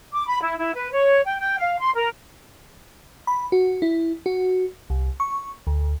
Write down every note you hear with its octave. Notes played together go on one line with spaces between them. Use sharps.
D6
B5
E4
E4
B4
C#5
G5
G5
F5
C6
A#4
B5
F#4
E4
F#4
C2
C#6
D2